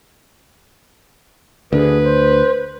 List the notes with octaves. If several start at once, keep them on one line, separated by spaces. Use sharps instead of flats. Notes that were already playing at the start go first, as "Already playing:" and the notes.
D2 D3 G#4 B4
C5